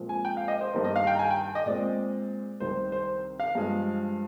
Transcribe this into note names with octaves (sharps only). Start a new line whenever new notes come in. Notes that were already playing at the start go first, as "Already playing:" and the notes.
Already playing: A#2 F3 G#3 C4
G#5
G5
F5
D#5
C5
G2 D#3 A#3
D#5
F5
G5
A#5
G#5
G5
D#5
A#2 G#3 C4 D5
C2 C3 D#3 C5
C5
F5
G2 F3 G#3